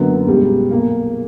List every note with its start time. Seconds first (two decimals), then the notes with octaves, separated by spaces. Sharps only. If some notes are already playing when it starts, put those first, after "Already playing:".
Already playing: F#1 F#2 D3 F#3 B3
0.27 C#2 B2 G3
0.71 B1 A#2 A#3